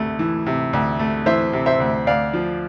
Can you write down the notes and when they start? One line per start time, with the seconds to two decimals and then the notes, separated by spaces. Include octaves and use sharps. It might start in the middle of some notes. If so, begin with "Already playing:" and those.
Already playing: D2 C3 A3
0.19 E3
0.46 C3
0.73 D2
0.99 A3
1.26 E3 C5 E5
1.53 C3
1.66 C5 E5
1.80 D2
2.07 D2 D5 F5
2.34 F3